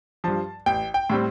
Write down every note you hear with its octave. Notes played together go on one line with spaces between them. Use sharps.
G2 F3 A5
A1 G5
G5
A2 G3 C4